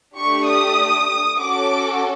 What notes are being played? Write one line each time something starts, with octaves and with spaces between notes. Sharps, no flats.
A3 D4 G4 C#6
D#6
C#4 F#4 A4 D6